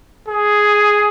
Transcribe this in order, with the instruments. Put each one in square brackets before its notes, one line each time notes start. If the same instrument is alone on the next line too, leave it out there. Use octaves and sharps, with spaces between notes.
[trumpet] G#4